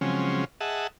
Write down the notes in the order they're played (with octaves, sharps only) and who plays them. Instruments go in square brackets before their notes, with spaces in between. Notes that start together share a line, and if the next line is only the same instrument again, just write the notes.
[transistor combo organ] C#3 F3 F#3 G#3 C4 C#4
G#4 D#5 E5 F#5 A5